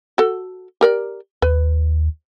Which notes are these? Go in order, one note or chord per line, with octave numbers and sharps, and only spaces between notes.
F#4 A4
G4 A#4 D5
D#2 B4